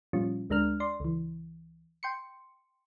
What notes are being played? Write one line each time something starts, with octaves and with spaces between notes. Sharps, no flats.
A#2 F3 G3 C#4 F4
D2 G#3 D4 A#4 F6
D5 C6
C#2 E3
G5 C6 C#7